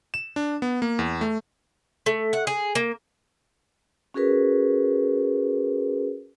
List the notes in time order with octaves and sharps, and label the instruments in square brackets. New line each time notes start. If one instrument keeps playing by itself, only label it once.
[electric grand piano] E7
D4
B3
A#3
E2
A3
[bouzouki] A3
F#5
G#4
A#3
[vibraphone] C#4 F#4 G#4 A#4 B4